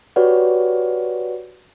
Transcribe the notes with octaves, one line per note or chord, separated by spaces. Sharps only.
F#4 G4 B4 C#5 D5 F#5